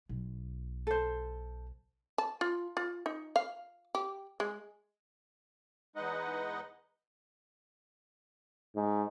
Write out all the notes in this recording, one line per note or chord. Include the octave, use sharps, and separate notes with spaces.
B1
A4 C5
A5
F4
F4
D#4
F5
G4
G#3
E2 G#3 D#4 B4 D#5 F#5
G#2